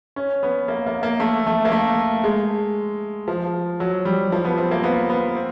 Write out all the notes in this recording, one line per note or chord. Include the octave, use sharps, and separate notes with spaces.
C#4
B3
A#3
A#3
A#3
A3
A3
A#3
A3
G#3
F3
F#3
G3
F3
B3
C4
A#3
B3
B3
C4